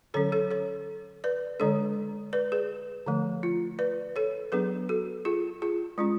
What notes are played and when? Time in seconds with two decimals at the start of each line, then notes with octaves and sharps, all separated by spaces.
0.14 D3 F#3 C#4 A4 C#5
0.32 A4 C#5
0.51 A4 C#5
1.24 B4 D5
1.60 D3 G#3 D4 A4 C#5
2.33 B4 D5
2.52 G#4 B4
3.06 D3 F3 A3
3.43 F4
3.79 B4 D5
4.16 A4 C#5
4.52 F#3 B3 D4 G#4 B4
4.89 F#4 A4
5.25 F4 G#4
5.62 F4 G#4
5.98 G#3 C#4 F4